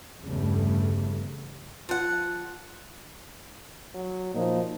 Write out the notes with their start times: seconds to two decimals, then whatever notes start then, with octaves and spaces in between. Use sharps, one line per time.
0.24 G1 E2 G2 C#3 G3 A3
1.89 F3 F#5
3.94 F#3
4.35 A#2 F3 D#4